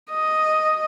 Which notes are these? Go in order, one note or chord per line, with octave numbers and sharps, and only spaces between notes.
D#5